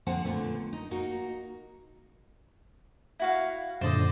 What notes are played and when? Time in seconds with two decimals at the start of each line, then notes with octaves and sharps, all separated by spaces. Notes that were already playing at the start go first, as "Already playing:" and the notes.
0.06 D3 F3 A#3 C4 F#5 A5
0.24 A#2 D3 A3 B3
0.73 D#4
0.91 A#3 D#4 F#4
3.19 E4 F#4 F5
3.81 F#2 A#2 D3 C5 D5 D#5